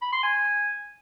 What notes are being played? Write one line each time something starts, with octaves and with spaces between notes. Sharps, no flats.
B5
C6
G#5